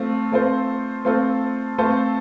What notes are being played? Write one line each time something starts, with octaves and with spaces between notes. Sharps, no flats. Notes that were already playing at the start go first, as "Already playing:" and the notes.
Already playing: A3 C4 F4
A3 C4 F4 A4 C5
A3 C4 F4 A4 C5
A3 C4 F4 A4 C5